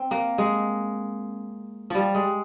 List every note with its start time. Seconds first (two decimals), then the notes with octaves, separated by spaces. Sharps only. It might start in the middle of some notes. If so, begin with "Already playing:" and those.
Already playing: C4
0.11 A#3
0.38 G#3
1.90 F3 G3
2.15 G#3